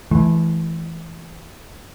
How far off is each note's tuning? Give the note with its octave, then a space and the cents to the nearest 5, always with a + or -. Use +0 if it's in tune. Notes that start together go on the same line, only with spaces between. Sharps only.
E3 +0 A3 -35